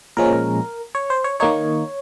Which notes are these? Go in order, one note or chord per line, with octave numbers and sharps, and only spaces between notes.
A#2 F3 G#3 C#4 A#4
C#5
C5
C#5
D#3 A#3 D#4 C#5